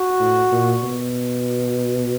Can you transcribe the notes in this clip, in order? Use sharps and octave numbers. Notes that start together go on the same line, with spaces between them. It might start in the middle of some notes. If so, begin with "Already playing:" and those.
Already playing: F#4
A2
A#2
B2